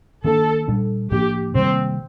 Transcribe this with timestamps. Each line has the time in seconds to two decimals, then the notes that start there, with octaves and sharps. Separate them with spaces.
0.24 D#3 A#3 D4 A4
0.68 A#2 G3 D4
1.11 A2 F3 A#3 D4 G4
1.55 C3 D#3 G3 A#3 C4